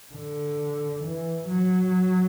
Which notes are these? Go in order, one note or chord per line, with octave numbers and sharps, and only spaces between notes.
D3
E3
F#3